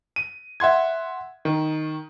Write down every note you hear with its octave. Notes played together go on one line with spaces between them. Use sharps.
D#7
E5 F#5 C6 G#6
D#3